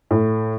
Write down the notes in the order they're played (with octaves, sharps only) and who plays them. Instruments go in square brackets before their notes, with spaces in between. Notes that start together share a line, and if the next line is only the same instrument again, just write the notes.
[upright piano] A2